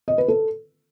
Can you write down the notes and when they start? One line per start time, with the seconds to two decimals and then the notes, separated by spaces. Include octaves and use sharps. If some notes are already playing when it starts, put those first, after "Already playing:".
0.08 D#5
0.18 B4
0.28 A4